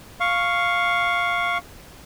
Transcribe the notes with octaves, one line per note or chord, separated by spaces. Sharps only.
F5 C#6